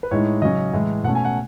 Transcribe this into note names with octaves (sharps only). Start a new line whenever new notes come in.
B4
A2 G#3 D#4 C#5
C#3 F#3 C#4 D#5
A2 E3 G#3
B2 A3 C#4 F#5
G#5
F#5